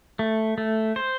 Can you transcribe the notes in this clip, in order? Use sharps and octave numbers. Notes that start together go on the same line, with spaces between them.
A3
A3
C5